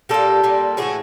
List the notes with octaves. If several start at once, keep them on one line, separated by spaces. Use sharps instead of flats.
A#2 G3 A#3 G4 A4
A#2 G3 A#3
A2 E3 A3 F#4 G#4